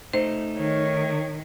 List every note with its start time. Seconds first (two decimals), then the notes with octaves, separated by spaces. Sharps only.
0.13 A3 D#4 C5
0.58 D#3 C#5